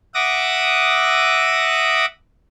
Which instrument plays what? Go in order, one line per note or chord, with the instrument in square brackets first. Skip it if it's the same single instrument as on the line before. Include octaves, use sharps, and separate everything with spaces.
[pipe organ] E5 F#5 D6 D#6 A#6